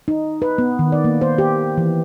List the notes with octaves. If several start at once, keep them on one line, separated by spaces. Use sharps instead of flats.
D#4
B4
B3
D#3
D5
A#3
C5
G4
E3